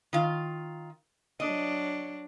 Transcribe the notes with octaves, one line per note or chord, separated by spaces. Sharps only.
D#3 F4
F#3 D4 D#5